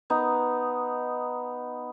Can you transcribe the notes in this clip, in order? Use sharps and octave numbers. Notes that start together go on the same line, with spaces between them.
B3 D#4